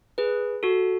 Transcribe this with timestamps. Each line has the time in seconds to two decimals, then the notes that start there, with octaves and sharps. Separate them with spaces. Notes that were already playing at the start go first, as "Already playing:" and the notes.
0.18 G#4 B4
0.63 F#4 A4